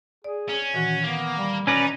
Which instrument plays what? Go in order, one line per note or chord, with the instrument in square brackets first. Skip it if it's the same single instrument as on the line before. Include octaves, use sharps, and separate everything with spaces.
[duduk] G#4 [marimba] D5
[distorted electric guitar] C#4
[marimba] A#2 D#3 E3 [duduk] F#4
[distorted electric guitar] A#3 [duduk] B3
[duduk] G3
[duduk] B2 [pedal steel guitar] C#4 B4 D5 [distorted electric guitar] D#4